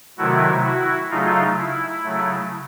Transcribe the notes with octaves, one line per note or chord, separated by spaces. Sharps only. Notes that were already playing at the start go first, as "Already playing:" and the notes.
C3 D#3 F#3 A3 E4 F#4
E4 F#4
C#3 F#3 A3 D#4 F4
E4
C#3 F#3 A3